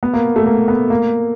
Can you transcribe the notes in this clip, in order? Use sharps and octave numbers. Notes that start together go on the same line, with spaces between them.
B3
A#3
A3
A#3
B3
A#3